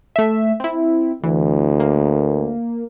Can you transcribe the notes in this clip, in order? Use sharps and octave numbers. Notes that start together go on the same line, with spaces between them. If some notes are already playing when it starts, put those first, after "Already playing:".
A3 E5
C4 E4
D2 E3
A#3